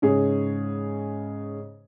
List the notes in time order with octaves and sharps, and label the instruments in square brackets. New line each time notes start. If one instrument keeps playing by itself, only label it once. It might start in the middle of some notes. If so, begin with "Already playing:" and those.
[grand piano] G#2 C#3 G#4 C#5